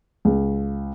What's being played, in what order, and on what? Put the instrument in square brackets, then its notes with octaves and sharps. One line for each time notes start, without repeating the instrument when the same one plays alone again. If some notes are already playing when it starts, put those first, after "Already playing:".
[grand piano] C#2